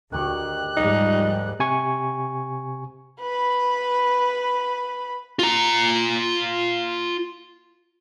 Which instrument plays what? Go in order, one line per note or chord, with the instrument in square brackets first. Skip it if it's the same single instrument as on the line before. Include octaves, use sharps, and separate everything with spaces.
[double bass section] D2 [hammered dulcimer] D#3 G4 C#6 [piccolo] F#6
[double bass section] G#2 F3 G3 [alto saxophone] D#4
[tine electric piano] C3 G#5 C#6
[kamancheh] B4 B5
[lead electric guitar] F4 A#5